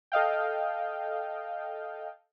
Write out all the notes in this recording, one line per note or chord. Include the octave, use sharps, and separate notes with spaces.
A4 D#5 F5 G5